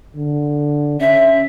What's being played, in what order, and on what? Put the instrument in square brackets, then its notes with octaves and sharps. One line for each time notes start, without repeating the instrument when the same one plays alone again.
[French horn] D3
[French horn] C#4 [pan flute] E5